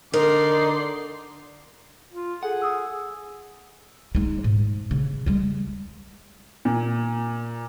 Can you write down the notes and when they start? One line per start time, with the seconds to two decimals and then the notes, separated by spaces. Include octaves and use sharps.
0.14 D3 D#4 A#4 D5 C6
2.12 F4
2.43 G#4 A4 F#5
2.62 D#6 E6
4.15 G#3 D#4
4.44 G#2
4.91 C#3
5.26 G3 G#3
6.65 A#2